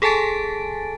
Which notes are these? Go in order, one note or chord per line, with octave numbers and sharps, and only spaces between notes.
G#4 A4 G#5 A5 A6 D7